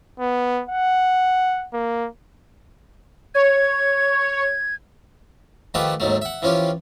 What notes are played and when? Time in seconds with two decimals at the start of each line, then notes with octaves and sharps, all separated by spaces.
0.20 B3
0.69 F#5
1.73 A#3
3.35 C#5 G#6
5.74 D#3 F3 A3 G4 B4 F#5
6.00 D#2 G#2 F#3 A3
6.22 E5 F#5
6.42 E3 F3 C#4 F4 G4